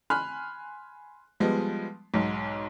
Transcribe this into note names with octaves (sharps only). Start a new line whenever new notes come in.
G#5 B5 C6 F6 F#6
F3 G3 G#3 B3
B1 G#2